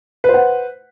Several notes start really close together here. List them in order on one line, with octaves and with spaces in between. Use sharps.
B4 C5 F#5